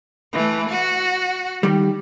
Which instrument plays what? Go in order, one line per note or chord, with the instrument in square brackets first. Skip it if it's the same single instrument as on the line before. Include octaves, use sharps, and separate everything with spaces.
[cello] E3 A3
F#4
[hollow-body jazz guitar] D#3 G3